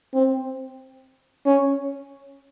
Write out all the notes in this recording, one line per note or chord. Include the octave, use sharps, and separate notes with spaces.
C4
C#4